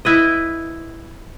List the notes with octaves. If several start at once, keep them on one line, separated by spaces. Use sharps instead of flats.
E4 B4 D#5